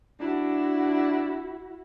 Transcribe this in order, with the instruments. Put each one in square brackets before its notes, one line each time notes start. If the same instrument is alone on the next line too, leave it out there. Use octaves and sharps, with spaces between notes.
[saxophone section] D4 [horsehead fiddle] E4 F#4